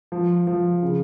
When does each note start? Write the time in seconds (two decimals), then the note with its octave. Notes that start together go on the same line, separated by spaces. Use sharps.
0.12 F3
0.47 F3
0.83 C#3